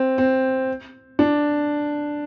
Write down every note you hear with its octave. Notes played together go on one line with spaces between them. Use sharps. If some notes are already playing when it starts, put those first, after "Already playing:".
Already playing: C4
C4
D4